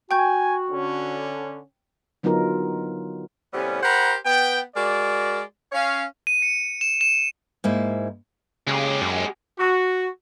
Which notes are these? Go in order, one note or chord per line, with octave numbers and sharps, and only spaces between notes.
F#4 G5 G#5 C#6 G6
D3 C#4
D3 F#3 B3 D#4 F4 A#4
A2 C3 G3 B3 C#4
G4 A#4 C5 F#5 A#5 B5
B3 G5
G#3 F#4 A#4 D5
C#4 C#5 F5
D#7
C#7
E7
E7
G#2 A#3 E4
C#3 G#3 G4
F#2
F#4